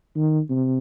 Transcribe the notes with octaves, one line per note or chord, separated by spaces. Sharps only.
D#3
C3